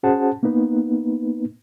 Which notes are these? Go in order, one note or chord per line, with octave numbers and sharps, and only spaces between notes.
C#4 F#4 G#4 C5 F#5 A5
A#3 B3 D#4 B4